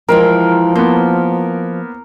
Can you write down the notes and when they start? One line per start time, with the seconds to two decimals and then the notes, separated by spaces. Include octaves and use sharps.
0.08 E3 F3 G#3 C4 A#4
0.75 A#3 B3 C5